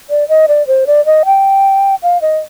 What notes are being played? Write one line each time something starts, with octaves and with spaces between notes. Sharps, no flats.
D5
D#5
D5
C5
D5
D#5
G5
F5
D#5